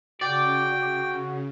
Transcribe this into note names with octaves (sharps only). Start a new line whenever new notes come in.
C#3 F#4 D5 G5